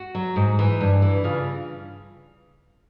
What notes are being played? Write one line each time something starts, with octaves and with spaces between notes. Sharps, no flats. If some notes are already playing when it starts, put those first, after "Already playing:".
Already playing: F#4
F#3
G#2
E3
G2
E3
C#3 F4